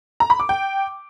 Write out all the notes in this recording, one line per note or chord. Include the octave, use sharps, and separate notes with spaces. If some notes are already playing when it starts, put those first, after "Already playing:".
A#5
B5
D6
G5